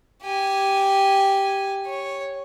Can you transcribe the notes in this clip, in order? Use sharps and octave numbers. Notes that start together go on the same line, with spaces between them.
G4 G#5
C#5